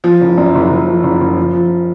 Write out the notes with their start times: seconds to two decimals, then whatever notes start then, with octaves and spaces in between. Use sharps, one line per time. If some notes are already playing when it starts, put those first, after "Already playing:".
0.04 F3
0.21 F#1
0.38 F#2
0.54 F#1
0.70 F#1
0.88 F3
1.03 F#1
1.21 F#1
1.37 F3
1.53 F3